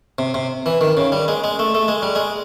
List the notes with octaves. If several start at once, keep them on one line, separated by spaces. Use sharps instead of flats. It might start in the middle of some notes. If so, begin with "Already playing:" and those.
C3
C3
E3
D#3
C#3
G3
G#3
G#3
A3
A3
G#3
G3
G#3